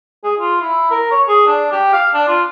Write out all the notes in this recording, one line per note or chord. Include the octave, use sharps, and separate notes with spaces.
G#4
F4
E4
A#4
C#5
G#4
D4
G4
F5
D4
F4